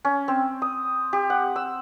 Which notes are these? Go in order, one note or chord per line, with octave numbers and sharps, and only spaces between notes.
C#4
C4
D#6
G4
F#5
E6